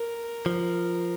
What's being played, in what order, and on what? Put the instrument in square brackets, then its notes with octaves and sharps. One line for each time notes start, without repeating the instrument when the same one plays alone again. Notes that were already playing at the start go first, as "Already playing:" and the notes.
Already playing: [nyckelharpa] A#4
[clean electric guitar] F3